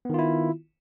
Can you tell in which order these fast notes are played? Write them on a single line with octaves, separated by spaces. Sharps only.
B3 D#3 F4 E4